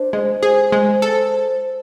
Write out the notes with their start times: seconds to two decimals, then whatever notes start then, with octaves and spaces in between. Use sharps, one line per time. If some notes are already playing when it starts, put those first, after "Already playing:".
Already playing: D4 C5
0.13 G#3
0.43 G#4
0.72 G#3
1.02 A4